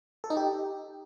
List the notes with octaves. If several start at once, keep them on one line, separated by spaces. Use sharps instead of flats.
A4
D#4
G4